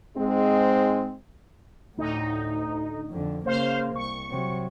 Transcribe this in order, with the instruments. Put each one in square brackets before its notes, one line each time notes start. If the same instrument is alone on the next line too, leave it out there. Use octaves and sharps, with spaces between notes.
[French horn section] G#2 G#3 C4
[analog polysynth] D2 D#4 [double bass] A2
[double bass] F2 D3
[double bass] C#3 A#3 [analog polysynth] C5 F5
[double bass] C2 [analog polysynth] C#6
[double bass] C3 F#3